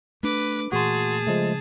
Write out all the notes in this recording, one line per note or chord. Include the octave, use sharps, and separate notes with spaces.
A3 D4 B4 D6
A#2 E3 A3 F#4 G#4 A5 C6
C#3 F3 G#3 A3